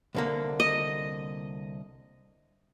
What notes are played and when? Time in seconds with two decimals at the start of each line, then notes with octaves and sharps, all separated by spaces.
0.15 C2 D3 A#3
0.60 D#5